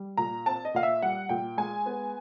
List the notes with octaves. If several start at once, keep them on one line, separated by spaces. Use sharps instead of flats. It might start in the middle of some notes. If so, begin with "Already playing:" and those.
Already playing: G3
A#2 A#5
C4 A5
D#5
A#2 F5
E5
G3 F#5
A#2 G5
G#3 G#5
B3